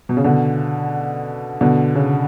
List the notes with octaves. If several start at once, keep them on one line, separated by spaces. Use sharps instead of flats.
B2
C#3
B2 D3
B2 D3
C#3